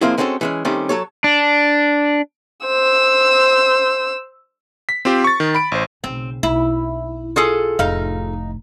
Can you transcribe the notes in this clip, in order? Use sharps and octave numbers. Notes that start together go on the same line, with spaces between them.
F3 G#3 A#3 C4 E4
G#3 C4 C#4 F#4 G4 A4
E3 G#3 C#4
D#3 G3 A3 C4 C#4
F#3 A4 C#5
D4
C5 E6
B6
C4 F4 G4 C5
C#6 A6
D#3
B5 D7
A1 C5
B1 C#3 C4
B1 E4
F4 G#4 A4
F1 A2 D#4 F5